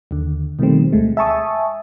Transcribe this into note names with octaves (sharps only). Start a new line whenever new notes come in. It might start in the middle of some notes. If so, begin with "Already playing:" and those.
D#2 D3
B2 D#3 F3 G3 A3 C4
D2 G#3 A3
E5 G#5 A5 C#6 D#6